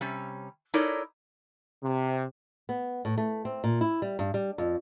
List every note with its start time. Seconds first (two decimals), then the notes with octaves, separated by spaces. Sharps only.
0.01 C3 G3 C#4
0.74 D#4 E4 A4 A#4 C#5 D5
1.83 C3
2.69 B3
3.05 A2
3.18 A3
3.45 C4
3.64 A#2
3.81 E4
4.02 G3
4.19 G2
4.34 G3
4.58 F2